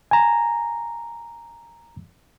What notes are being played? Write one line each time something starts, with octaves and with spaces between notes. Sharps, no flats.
G#5 A#5